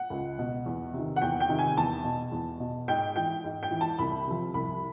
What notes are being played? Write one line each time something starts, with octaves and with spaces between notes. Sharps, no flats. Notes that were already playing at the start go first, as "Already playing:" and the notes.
Already playing: F#5
C#2
B2
E2
C3 D#3
F#5
E2 G5
G5
C3 D#3
G#5
E2 A5
B2
E2
B2
G#2 G5
E3 G5
G#2
G5
E3
A5
C2 B5
C3 F3
C2 B5